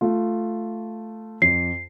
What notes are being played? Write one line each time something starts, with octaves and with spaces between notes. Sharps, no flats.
A3 F4
F2 C7